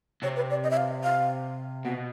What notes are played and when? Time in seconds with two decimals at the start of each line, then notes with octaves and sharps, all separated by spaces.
0.23 C3 C#5
0.36 B4
0.50 D5
0.64 D#5
0.71 E5
0.77 F5
1.03 F5
1.85 B2 F#5